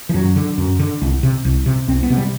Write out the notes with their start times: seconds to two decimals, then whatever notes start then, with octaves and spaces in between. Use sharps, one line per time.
0.09 E3
0.14 F#2 F#3
0.36 D3
0.58 F#2
0.79 D3
1.02 C2
1.23 C3
1.45 C2
1.66 C3
1.88 C2 C4
2.03 B3
2.10 C3
2.17 G3